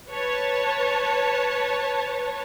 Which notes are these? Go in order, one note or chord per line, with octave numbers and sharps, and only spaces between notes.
B4 C#5 A5